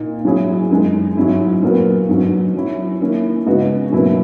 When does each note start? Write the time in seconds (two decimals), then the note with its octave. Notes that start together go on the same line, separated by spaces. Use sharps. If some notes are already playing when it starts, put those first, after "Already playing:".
Already playing: A#2 A#3 D#4
0.24 G#2 F#3 C#4 E4 G#4
0.71 F#2 D#3 G#3 D#4
1.17 G#2 F#3 C#4 E4
1.63 A#2 F#3 B3 F#4 A#4
2.09 G#2 F#3 C#4
2.54 F#3 C#4 E4
3.00 D#3 A#3 C#4 E4
3.46 C#3 G#3 B3 D#4 F#4
3.92 B2 F#3 A#3 E4 B4